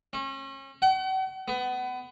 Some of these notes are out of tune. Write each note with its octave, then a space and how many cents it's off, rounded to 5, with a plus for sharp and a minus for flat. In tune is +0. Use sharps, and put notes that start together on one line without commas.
C#4 -35
F#5 +45
B3 +25